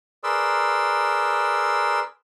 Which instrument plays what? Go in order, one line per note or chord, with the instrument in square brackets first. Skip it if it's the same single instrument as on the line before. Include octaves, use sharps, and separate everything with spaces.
[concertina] G#4 A#4 B4 D5 C6 E6